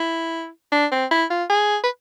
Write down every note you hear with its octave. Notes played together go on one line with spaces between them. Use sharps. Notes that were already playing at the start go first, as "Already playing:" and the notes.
Already playing: E4
D4
C4
E4
F4
G#4
B4